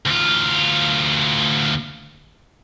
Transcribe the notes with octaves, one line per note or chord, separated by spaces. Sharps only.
D2 F4